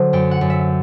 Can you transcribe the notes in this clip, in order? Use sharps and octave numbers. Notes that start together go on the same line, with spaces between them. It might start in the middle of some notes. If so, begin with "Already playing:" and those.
Already playing: D3 F#3 C5
F#2 G5
F#5
F#2
E5